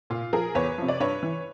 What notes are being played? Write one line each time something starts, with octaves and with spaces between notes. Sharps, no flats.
A#2 F4
F3 G#4 A#4
E2 B4 C#5
C3 F3
D5
G2 B4 C#5
E3